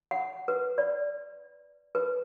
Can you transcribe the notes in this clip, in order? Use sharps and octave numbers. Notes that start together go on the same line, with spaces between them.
F#5
B4
D5
B4